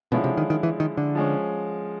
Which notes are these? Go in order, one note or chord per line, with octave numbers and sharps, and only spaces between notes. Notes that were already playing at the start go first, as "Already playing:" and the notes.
B2 D3 F3 G#3 C#4 E4
C3
D#3
D#3
E3
D#3
D3
F3 G#3 C#4